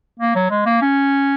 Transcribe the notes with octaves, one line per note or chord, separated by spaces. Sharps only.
A#3
F#3
G#3
A#3
C#4